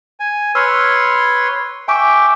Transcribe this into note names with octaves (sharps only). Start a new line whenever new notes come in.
G#5
B4 C#5 C6 E6 F6
E5 G5 G#5 C#6 D6